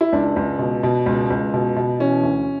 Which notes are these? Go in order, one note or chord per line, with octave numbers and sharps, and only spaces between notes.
E4
C#2 D4
C#2
B2
B2
C#2
C#2
B2
B2
E3 C#4
D2